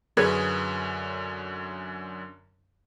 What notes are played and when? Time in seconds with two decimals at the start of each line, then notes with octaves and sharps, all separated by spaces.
0.17 F#2 D3 C#4 G#4 B4 C#5